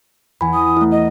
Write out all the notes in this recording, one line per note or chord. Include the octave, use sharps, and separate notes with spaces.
E2 G#5 B5
D#6
A3 E4
D#5